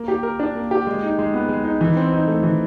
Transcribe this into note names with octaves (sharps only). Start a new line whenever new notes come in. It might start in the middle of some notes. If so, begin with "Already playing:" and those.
Already playing: A#3
G4
A#4
D4
A#3
G4
G#3
D#4
G#3
B3
G#3
D#4
E3
C4
D#4
A3
E3